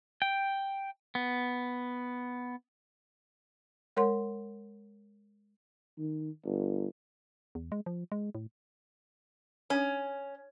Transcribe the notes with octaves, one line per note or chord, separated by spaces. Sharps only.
G5
B3
G#3 A#4 C#5 F#5 C6
D#3
G1
E2
G#3
F3
G#3
A2
C#4